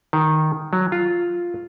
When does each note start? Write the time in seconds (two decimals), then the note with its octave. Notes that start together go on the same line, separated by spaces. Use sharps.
0.13 D#3
0.73 F#3
0.92 F4